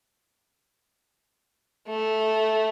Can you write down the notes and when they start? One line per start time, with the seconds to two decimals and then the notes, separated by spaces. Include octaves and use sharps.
1.87 A3